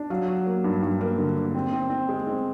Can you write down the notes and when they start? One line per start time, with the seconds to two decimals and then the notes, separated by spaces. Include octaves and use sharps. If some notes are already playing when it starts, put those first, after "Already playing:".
Already playing: D4
0.10 F#3 F5
0.28 F#3
0.46 A#3
0.64 G2
0.82 G2
1.01 A#3
1.18 D3
1.36 A#3
1.54 C4
1.73 C4
1.90 C4
2.09 G#3
2.27 C4